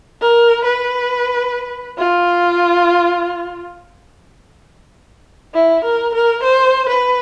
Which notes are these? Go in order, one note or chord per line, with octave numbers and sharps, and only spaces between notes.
A#4
B4
F4
E4
A#4
A#4
C5
B4